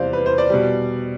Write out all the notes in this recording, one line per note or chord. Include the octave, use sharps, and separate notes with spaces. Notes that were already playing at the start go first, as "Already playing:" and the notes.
Already playing: E2 C3 G3 C5 D5 F5
B4
C5
D5
B2 G3